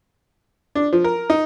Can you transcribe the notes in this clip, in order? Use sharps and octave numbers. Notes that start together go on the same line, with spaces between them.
D4
F3
A#4
D#4